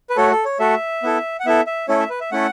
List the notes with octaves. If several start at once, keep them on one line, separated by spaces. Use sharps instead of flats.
B4
A3 F#4 A4 C#5
A4
C#5
A3 F#4 A4 E5
B3 E4 A4
F#5
B3 E4 A4 E5
E5
A3 C#4 E4 A4 C#5
E5
B4
E5
A3 C#4 E4 A4 F#5